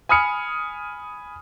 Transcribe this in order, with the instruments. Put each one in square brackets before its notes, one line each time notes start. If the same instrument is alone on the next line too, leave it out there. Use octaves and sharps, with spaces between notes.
[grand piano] G#5 B5 D#6 F6 C#7